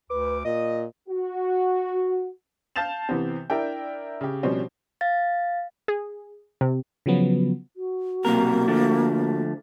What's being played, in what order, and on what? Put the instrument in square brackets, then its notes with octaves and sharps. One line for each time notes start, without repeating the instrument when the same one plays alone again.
[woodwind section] D2 D6 [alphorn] B4
[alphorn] A#2 [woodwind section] D#5
[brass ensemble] F#4
[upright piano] F5 A5 G6 A6 E7 F7
C3 E3 B3 C4
D4 E4 A#4 D5 E5 G5
C#3 G4
B2 F3 G3 C4 C#4
[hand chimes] F5 A6
[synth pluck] G#4
C3
[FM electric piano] C#3 F3 F#3 B3
[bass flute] F#4
[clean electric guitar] B1 C3 A#4 [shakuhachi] A#3
[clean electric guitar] D3 F3 A3